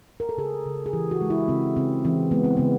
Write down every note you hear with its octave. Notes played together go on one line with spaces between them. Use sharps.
A#4
A4
C#3 G#4
C#3
G#4
E3 G4
F#4
G#3
E4
C#3 C4
C#3 C4
E3 C4
G#3 B3
C4
C#3 B3